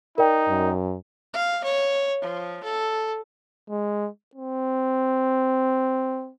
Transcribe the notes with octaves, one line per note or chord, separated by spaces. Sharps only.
D#4 A#4 D5 G5
F#2
F5
C#5
F3
A4
G#3
C4